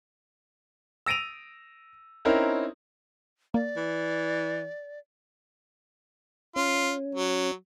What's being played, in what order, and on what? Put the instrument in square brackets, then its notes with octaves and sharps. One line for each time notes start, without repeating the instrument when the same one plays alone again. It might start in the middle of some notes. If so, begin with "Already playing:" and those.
[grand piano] E6 A#6 D7 D#7 F7
C4 C#4 D#4 E4 A#4
[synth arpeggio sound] A#3 [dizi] D5
[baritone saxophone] E3
[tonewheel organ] C#4 [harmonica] F4
[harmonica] F#3